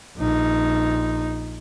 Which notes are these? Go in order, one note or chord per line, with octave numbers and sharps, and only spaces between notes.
A#1 D#4